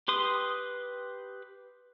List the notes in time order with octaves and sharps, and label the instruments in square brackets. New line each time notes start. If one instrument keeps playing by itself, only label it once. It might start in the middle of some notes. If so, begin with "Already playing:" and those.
[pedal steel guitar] G4 B4 C6 D#6